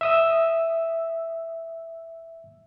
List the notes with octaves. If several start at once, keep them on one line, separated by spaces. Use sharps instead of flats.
E5 D#6 E6